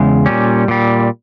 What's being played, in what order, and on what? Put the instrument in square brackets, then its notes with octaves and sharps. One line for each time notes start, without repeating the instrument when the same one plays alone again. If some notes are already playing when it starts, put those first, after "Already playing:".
Already playing: [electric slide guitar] E2 C#3 G#3
A#2 G3 C#4
A#2 G3